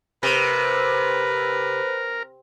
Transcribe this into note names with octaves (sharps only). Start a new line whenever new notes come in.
C3 A#4 B4